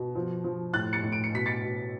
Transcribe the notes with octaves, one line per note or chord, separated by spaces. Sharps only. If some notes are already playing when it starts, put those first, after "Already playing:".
Already playing: B2
F3
F3
A2 F#6 A6
A6 C#7
A2
D7
C#7
B2 B6
A6 C#7
B2